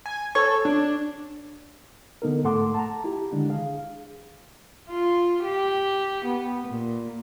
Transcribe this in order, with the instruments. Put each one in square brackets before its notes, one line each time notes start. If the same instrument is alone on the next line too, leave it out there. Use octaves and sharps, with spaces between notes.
[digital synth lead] G#5
[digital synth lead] A4 [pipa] C#5
[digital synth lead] D4
[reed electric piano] D3 B3 D#4 A4 A#4
G#2 A3 A4 F#5 C6 D6
A5 A#5
E4 G4
D3 D#3 G#3 D4
G#4 F5
[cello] F4
G4
B3
A#2